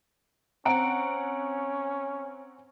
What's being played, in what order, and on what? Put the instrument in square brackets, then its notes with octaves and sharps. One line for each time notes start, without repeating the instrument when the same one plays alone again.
[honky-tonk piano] C4 F#5 D7 [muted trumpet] C#4 [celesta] A#5